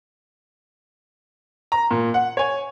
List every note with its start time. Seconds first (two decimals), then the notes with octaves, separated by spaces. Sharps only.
1.72 A#5
1.91 A#2
2.14 F#5
2.37 C#5 G#5